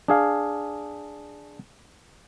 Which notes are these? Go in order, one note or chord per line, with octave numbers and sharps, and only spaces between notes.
D4 G#4 F5